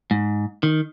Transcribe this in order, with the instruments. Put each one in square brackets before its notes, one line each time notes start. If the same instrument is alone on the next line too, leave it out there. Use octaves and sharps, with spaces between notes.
[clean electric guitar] G#2
D#3